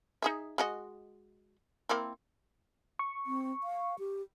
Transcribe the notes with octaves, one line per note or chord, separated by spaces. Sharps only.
D#4 G#4 E5
G#3 F#4 D#5
A#3 C4 E4
C#6
C4
F5
G4